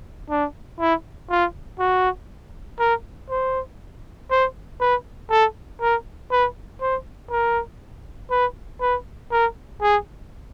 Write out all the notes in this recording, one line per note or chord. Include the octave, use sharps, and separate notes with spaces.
D4
E4
F4
F#4
A#4
C5
C5
B4
A4
A#4
B4
C5
A#4
B4
B4
A#4
G#4